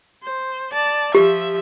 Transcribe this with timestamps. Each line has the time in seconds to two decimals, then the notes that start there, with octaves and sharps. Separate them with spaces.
0.24 C5
0.73 D5 A5
1.15 F3 G4 E5